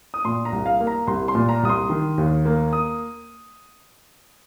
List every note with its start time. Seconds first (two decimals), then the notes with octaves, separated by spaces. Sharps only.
0.14 D#6
0.25 A#2 C6
0.45 A#5
0.52 C2
0.66 F5
0.80 A#3
0.87 A#5
1.07 C2 C6
1.28 C6
1.35 A#2
1.49 A#5
1.63 C2 D#6
1.69 C6
1.90 D#3
2.18 D#2
2.45 A#3
2.73 D#6